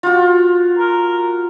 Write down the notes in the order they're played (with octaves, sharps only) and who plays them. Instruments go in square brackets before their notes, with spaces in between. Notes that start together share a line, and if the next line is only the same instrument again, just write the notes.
[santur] F4 F#4
[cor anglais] A#4